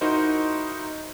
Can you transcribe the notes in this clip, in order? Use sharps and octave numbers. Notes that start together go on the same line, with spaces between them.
D#4 E4 F#4 A#4 C5